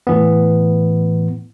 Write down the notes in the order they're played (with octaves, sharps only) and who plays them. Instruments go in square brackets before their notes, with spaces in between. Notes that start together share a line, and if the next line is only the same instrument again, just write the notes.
[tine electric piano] A2 E3 B3